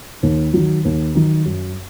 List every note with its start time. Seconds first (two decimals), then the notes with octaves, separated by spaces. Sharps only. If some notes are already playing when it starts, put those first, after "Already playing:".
0.23 D#2
0.54 D#3 F#3
0.85 D#2
1.15 D#3 F#3
1.45 F#2